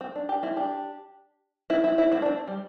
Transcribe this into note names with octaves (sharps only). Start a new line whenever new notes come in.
C4
D4
D4 G4
C4 E4
D4 G4
C4 E4
C4 E4
C4 E4
C4 E4
D4
C4
G3